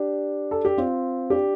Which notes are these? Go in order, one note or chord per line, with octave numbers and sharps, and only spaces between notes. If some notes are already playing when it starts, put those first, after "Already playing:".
Already playing: D4 G4
A4
G4
C4 F4
D4 G4